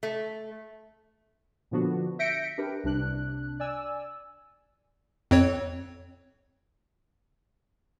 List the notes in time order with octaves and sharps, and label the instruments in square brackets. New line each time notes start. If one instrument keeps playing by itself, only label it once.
[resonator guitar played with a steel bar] A3
[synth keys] A#2 D3 F3 B3 D4 F#4
E5 G6 A#6 B6 C#7 D7
D4 G4 A#4 B4
C2 C3 D4 F#6
D5 G#5 E6
[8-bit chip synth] F2 C4 C#5